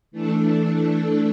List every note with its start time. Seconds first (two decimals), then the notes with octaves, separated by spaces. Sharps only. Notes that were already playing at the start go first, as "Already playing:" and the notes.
0.11 E3 A3 D4 A4